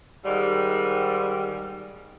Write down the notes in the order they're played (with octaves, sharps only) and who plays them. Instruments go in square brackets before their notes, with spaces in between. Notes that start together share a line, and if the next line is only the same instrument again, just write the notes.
[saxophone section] G#2 D#3 G3